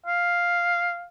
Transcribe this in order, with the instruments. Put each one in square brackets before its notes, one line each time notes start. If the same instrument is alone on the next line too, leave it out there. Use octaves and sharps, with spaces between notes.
[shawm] F5